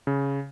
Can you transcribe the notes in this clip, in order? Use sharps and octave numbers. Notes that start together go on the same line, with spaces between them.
C#3